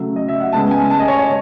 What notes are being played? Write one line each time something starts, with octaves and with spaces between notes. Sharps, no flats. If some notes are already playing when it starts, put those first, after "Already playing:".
Already playing: C#3 F#3 A3
D#5
E5
F#5
C#3 G#3 B3 A5
G#5
A5
D#5
C#5
C#5